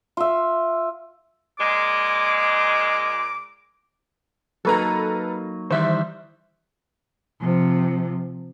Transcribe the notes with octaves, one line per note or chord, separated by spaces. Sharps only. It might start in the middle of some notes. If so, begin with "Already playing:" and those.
F4 E5
A#2 G#3 D6
F#3 A#3 D#4 A4 B4 A#5
D#3 E3 G3 C5 E5
C3 F3